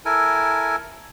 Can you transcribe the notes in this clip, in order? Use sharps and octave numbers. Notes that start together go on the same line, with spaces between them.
E4 A4 A#4 G#5